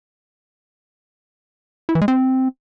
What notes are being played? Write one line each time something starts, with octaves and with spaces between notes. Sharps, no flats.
E4
E3
G#3
C4